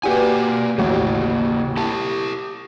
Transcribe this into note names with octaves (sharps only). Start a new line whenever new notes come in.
A#3 F#4 G4 B4 D5 G#5
A1 D#2 C#3 A#3 F#4
E4 G4 A5